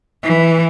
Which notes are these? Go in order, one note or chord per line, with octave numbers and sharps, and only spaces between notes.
E3